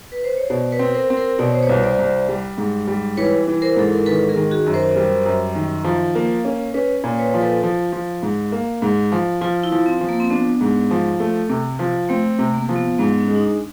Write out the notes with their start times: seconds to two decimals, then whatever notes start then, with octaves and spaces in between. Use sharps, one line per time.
0.12 B4
0.24 C5
0.37 C#5
0.50 B2 C5 D5
0.72 B4 C#5
0.79 C4
0.95 A#4 C5
1.10 C4
1.17 A#4 C5
1.39 B2 D5
1.47 C#5
1.55 C5
1.62 B4 C#5
1.69 C2
1.84 C5 D5
1.99 C2
2.28 G3
2.58 G#2
2.87 G3
3.17 E3 B4 C#5
3.47 E3
3.62 A#4 C5
3.76 G#2 A4
3.93 A#4
4.06 D#3 A4 B4
4.29 G#4 A#4
4.36 D#3
4.51 F#4 G#4
4.66 F#2
4.73 A#4 C5
4.96 G3
5.26 F#2
5.55 D#3
5.84 F3
6.15 A#3
6.45 C#4
6.74 C#4 B4 C#5
7.04 A#2
7.19 B4 C#5
7.34 F3
7.41 A4 B4
7.63 F3
7.92 F3
8.23 G#2
8.52 A#3
8.82 G#2
9.12 F3
9.41 F3 F4
9.64 E4
9.72 F3
9.86 C4
10.01 F3
10.09 A#3
10.20 C4
10.30 B3 D4
10.61 G#2
10.91 F3
11.20 A3
11.49 C3
11.79 F3
12.09 A3 C4
12.31 A3
12.39 C3
12.54 A#3
12.69 F3
12.76 B3
12.98 G#2 B3
13.20 C#4
13.28 G#3
13.35 D#4
13.43 D4